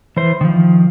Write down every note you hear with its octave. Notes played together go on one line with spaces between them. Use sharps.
E3 C5
D#3 F3